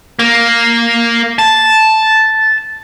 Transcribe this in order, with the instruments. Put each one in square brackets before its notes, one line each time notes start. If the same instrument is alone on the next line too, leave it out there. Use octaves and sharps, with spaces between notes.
[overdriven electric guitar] A#3
A5